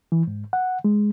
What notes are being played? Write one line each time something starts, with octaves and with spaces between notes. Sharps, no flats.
E3
G#2
F#5
G#3